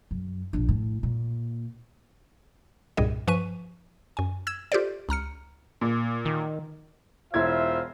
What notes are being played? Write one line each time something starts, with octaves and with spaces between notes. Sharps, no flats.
F#2
A#1 D4
A2
A#2
C2 G2 A#2 G3 G#4 D#5
G2 F3 B4 G#5 C#6 D#7
F#2 G#5
E6 G#6 E7
F4 G4 A4 C5 D5
C#2 A#5 F6 C#7
A#2
D#3
E1 E4 F4 C5 E5 G#6